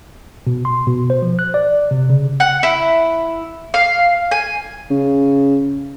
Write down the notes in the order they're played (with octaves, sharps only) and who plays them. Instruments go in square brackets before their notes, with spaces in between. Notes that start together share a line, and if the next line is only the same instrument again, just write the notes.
[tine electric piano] B2
C6
B2
C5
F3
F#6
D5
C3
C#3
[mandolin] F#5
E4
F5
G#5
[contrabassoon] C#3